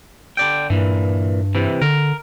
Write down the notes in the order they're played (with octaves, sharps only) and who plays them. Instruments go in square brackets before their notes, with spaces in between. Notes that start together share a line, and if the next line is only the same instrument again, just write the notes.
[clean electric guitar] D3 D5 G5
[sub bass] G2 [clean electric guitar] A#2 E3
[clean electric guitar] C3 E3
[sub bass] D3 [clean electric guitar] A#4